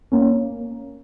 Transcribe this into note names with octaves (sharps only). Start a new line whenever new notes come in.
A#3 C#4